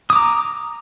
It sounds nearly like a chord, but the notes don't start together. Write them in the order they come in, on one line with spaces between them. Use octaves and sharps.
D#6 D6 A#5